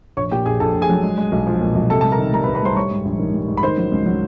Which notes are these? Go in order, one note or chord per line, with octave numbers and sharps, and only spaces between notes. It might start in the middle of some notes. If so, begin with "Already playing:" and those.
A#1 C#5 C#6
A#2 G4 G5
A#1 G#4 G#5
A#1 A4 A5
A#1
G#4 G#5
F#3
G#3
G#3
B1
F3
A#2
B1
C3 A4 A5
G3 A5
A#4 A#5
D#3
G3 A#4 A#5
B4 B5
C2
B4 B5
G3 C5 C6
G3 C#5 C#6
G#2
A#1
D#3
G3
G#2
B5
D#3 C5 C6
F#3
C#2
F#3